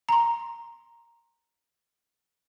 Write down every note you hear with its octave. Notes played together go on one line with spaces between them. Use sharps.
A#5 C6